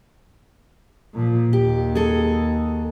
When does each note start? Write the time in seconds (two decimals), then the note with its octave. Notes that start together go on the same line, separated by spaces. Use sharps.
1.14 A#2 F3
1.53 D#2 G4
1.95 G#4 A4